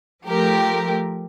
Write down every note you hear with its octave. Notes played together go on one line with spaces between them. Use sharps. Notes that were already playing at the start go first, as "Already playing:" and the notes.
F3 A3 G4 A#4